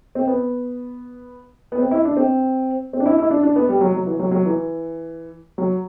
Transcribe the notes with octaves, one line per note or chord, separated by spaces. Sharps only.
C4
B3
B3
C4
E4
D4
C4
C4
D4
E4
E4
D4
D4
B3
G3
F#3
F#3
E3
F#3
F#3
E3
F#3